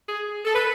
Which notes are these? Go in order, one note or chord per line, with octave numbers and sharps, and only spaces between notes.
G#4
A4
B4